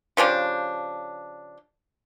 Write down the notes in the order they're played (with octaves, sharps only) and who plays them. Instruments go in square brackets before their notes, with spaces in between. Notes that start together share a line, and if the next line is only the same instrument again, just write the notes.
[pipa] C#3 F3 D4 G4